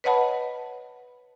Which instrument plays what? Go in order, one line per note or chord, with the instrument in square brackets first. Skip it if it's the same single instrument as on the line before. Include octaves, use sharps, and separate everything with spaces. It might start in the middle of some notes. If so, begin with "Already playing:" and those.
[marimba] B4 C#5 D#5 F#5 A5 B5